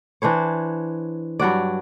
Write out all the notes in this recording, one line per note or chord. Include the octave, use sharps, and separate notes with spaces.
E3 D4 C5 C#5
G2 F#3 F#4 D5